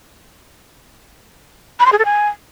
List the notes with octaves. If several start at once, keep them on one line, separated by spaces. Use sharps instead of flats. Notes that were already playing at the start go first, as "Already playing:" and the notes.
B5
C6
G#4
A4
G#5